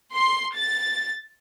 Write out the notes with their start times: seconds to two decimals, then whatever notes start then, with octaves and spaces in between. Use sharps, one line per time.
0.14 C6
0.54 A6